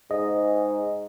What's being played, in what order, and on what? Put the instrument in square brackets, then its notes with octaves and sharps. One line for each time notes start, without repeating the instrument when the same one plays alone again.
[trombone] G#2 [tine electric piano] D#5